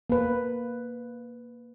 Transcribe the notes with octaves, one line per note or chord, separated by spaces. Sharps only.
A#3 B4